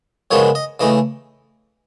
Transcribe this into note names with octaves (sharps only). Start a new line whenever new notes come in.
F#2 C#3 F3 G#3 B3 C#5
D#5
C#3 E3 A3 D#5